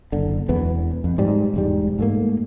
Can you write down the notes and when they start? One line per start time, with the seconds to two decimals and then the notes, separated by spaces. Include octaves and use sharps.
0.12 F#1 D3
0.49 E1 E2 E3 B3
1.04 F2
1.18 G#2 G3
1.54 E1 G#2 G3
1.99 G#2 A3 A#3